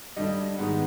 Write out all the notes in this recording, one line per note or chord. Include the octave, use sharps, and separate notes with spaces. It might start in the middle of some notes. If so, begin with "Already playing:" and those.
G2 D3 G3 D#5
G#2 D#3 G#3 B3